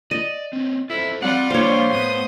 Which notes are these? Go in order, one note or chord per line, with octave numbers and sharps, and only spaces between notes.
D5 D#5
C4 C#4
E4 F4 A4 C5
G3 C4 F4 F#5
A#3 D4 C5 C#5 F5
A2 B3 D#6